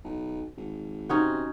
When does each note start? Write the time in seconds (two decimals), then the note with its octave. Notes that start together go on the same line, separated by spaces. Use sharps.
0.04 B1
0.57 G#1
1.09 C3 C#4 D#4 F#4